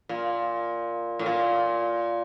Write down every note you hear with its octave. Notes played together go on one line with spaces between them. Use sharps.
A#2
A2
A#2